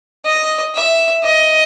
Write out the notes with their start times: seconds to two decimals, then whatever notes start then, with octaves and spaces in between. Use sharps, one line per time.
0.25 D#5
0.74 E5
1.23 D#5